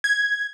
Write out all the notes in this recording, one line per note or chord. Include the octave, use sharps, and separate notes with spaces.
G#6